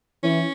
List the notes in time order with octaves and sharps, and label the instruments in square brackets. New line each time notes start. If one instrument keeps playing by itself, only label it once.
[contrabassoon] E3 [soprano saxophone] C#4